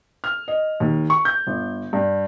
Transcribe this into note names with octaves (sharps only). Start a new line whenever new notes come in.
F6
D#5
D#2
C#6
G6
G1
G2